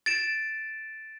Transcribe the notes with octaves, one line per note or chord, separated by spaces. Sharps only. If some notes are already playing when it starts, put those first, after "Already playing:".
A6 D7 E7